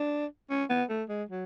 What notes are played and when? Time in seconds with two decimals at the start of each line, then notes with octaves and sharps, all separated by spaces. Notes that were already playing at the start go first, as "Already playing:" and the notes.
Already playing: D4
0.50 C#4
0.70 B3
0.89 A3
1.09 G#3
1.30 F#3